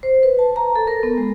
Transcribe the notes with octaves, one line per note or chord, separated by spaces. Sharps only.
C5
B4
A5
A#5
A4
A#4
B3
G#3